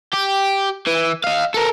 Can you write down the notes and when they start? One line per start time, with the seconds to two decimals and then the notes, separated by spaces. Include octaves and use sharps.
0.13 G4
0.87 E3
1.24 D#5 F5
1.54 A4 A#4